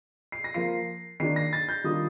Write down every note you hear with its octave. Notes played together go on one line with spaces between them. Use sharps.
C7
A#6
F3 A#3 F4 C7
D#3 A#3 D4 C7
A#6
A6
G6
D#3 G3 D4 F4 D#6